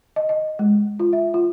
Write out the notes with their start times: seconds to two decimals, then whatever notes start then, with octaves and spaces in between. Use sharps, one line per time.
0.16 D#5
0.29 D#5
0.59 G#3
1.00 F4
1.13 E5
1.34 F4